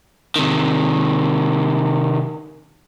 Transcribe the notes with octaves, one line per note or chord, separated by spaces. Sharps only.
C3 D#3